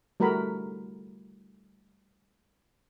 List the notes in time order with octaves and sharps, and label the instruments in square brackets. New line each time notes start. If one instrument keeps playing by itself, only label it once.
[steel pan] G3 A3 F#4 A#4 A#5 B5